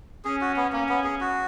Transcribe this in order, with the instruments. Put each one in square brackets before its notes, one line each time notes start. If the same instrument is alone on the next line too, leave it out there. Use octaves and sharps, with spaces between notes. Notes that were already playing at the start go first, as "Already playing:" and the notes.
[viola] C#4 [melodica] G#4
[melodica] F#4
B3
[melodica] A#3 [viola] C#4
[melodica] B3
G#4
F#4